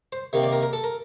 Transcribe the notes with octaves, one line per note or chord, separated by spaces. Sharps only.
C5
C3 D#3 A#3
D5
A#4
A#4
A4
A#4